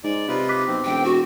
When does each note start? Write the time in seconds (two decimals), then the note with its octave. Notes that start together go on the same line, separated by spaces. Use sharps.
0.04 G#2 D5
0.28 C3 D#4 F4 B4
0.49 D6 F#6 B6
0.67 B1 C4
0.85 E1 G5
1.04 F#4